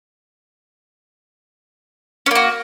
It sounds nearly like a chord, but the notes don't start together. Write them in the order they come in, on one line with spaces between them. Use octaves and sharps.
C#4 A#3 F#4